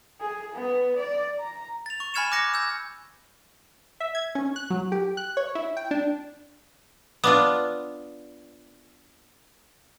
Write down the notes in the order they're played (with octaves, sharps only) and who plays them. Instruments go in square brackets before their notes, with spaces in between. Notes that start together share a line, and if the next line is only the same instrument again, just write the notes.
[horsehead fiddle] G#4
B3
D5
A#5
[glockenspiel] A6 F7
C#6
G#5 B5 F6 G#6 C#7 E7
D6 F#6 A#6 C#7
E6 G6
[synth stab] E5
G#6
C#4
F#6
F#3
G4
F#6
C#5
E4
G5
D4
[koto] B3 D4 F4 [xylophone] D6 D#6